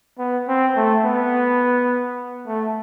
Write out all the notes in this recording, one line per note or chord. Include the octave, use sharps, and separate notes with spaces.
B3
C4
A3
B3
A3